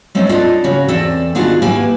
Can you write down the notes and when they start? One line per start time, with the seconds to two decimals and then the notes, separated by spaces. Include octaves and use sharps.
0.15 G#3 A3 C4 C#4
0.29 D4 E4 F4 A4 D5 D#5
0.64 C#3 C#4 F#4
0.88 E2 C4 A4 D5 E5
1.35 D#3 B3 D4 F4 F#4 G#4
1.62 A3 A#3 E4 G4 B4 G#5